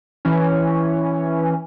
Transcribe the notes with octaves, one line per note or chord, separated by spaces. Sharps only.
E3 C#4